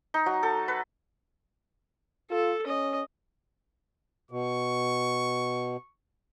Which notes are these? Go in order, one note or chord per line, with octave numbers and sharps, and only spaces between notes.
D#4
F#3
A4
B4
F4 A4
C#4 D#5
B2 C#6